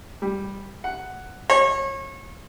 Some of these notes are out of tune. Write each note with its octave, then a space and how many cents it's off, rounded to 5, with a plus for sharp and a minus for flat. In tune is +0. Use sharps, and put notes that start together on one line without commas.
G3 +5
F#5 +5
C#5 -30